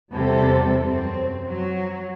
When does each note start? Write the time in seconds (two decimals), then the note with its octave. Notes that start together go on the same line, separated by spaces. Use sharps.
0.12 E2 C3 G3 A4
0.84 F#2 C4
1.48 F#3